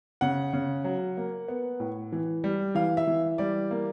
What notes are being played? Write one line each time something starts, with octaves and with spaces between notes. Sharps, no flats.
C#3 F#5
C#3
F#3
A#3
B3
A2
E3
G3
E3 F5
E5
E3
G3 D5
A#3